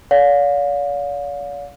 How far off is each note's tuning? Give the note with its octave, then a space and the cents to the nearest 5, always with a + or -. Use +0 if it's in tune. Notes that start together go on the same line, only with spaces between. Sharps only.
D5 -45 F5 +35